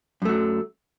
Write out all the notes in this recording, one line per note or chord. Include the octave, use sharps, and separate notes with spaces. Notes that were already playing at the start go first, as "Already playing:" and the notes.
F#2 F#3 A3